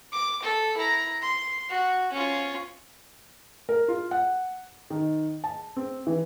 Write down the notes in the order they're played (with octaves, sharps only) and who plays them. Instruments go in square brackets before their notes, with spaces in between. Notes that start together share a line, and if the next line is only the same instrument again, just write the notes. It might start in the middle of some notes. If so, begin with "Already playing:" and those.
[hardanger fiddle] D6
A4
E4 A#5
C6
F#4
C#4 F4
[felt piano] A#4
F4
F#5
D#3
A5
C4
E3